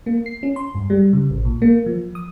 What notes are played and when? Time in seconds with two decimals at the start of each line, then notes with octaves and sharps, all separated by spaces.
0.06 A#3
0.26 C7
0.43 C#4
0.56 C6
0.75 G2
0.90 G3
1.13 C#3
1.30 A1
1.45 A#2
1.62 A#3
1.86 F3
2.15 D#6